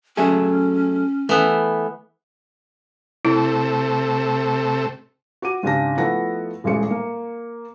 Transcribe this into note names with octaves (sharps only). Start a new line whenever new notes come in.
F#3 A3 C#4 G#4
E3 A3 B3
C3 A3 E4
F#4 D6 D#7
G#1 C#3 D4 G4 A5 A#6
F3 A3 B3 E4 F#5 A#6
D#1 A1 G3 G#3 C#7
A#3